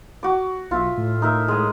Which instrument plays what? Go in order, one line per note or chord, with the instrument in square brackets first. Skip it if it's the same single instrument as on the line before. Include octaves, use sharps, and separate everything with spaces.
[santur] F#4 D6
[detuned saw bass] B1 [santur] F4 E5
[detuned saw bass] A2
[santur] D#4 A#4 E5
G#3 D#6